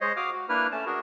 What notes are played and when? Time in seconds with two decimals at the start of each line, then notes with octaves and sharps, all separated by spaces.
0.01 G#3 C5 C#5 D#5
0.16 F#4 F5 D6 D#6 F6
0.33 F#4
0.49 A#3 D4 E4 B4 F6
0.72 A3 C#4 A5
0.86 D4 F#4 G#4 A#4